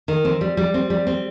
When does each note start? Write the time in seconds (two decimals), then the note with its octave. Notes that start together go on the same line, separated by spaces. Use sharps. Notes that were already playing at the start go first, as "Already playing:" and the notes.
0.08 D#3
0.25 C4
0.41 G3
0.57 G3
0.74 C4
0.90 G3
1.07 C4